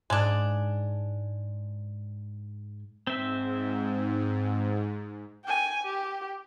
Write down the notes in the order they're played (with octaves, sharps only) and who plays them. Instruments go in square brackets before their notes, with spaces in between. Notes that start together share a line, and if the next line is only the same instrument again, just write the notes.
[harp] G#2 G#5 [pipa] G#3 D4
[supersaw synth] G#2 [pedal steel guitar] C4 E5
[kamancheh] G5 G#5
G4